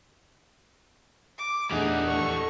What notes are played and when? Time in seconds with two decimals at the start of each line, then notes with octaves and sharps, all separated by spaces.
1.38 D6
1.72 E2 G3 A3 D4 D#4 G#4 F#5
2.07 A4 C#6